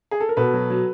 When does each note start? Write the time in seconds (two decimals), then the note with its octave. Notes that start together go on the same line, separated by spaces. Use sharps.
0.11 G#4
0.20 A4
0.29 A#4
0.37 B2 A4 B4
0.54 F#3
0.70 F#3